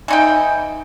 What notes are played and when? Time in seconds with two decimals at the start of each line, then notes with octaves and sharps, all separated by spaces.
0.08 E3 D#4 G5